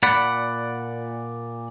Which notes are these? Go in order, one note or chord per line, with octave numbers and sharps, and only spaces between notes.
A#2 D5 F#5 B5